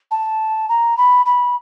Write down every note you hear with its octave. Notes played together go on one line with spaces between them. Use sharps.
A5
A#5
B5
B5